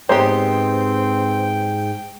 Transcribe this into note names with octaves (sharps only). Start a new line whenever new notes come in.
G#2 G#3 B3 C4 G4 C5 G5